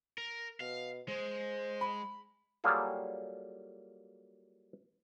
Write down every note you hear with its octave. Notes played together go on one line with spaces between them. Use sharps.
A#4
B2 F5
G#3 C5
B5
F#3 G3 A#3 F4 G#4 A4